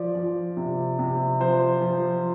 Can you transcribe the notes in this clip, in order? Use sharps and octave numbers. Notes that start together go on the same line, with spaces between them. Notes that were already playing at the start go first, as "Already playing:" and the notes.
Already playing: F3 D5
F3
C3
C3
F3 C5
F3